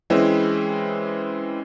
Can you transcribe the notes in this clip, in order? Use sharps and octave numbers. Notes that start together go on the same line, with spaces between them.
E3 G#3 C4 C#4 E4